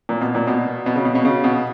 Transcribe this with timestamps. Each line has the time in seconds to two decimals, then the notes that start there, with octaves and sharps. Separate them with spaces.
0.09 A#2
0.21 B2
0.35 A#2
0.47 B2
0.86 B2
0.96 C#3
1.05 B2
1.15 B2
1.25 C#3
1.44 B2